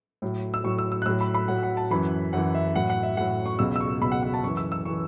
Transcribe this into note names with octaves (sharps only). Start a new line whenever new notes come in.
A2 F#3
E6
A2 F#3 C#6
E6
E6
F#6
A2 F#3 E6
B5
B5
A2 F#3 F#5
F#5
A5
F#2 E3 B5
F#2 E3 F#5
E5
A2 F#3 F#5
F#5
E5
A2 F#3 F#5
C#6
C#2 B2 F#3 E6
E6
C#6
C#2 B2 F#3 B5
F#5
F#5
A5
F#2 E3 C#6
E6
E6
E3 C#6